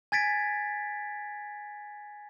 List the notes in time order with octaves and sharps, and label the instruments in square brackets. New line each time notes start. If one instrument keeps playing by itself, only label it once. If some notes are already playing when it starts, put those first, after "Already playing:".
[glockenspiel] G#5 G#6 A6 B6 D7